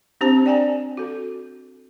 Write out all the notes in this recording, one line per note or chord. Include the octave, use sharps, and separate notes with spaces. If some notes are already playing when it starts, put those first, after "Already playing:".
C4 D4 G4 C5 A5
D5 G5 G#5 A#5
F#4 A4